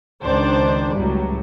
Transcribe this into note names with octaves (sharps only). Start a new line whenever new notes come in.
C#2 D#3 D4 C5 D5
C#2 A2 F#3 G3